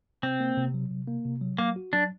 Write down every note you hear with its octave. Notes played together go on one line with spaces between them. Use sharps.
C3 C4
A#3
C3
F#3
C3
A#3
C3
F#3
F#3 A#3
F#4
F#3 D4